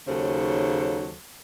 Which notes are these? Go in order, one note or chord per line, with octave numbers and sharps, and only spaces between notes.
D#2 C#3 F#3 A4 C5